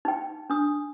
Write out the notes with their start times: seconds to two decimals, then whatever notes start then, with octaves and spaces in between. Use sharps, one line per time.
0.05 D#4 G5
0.50 D4 D#6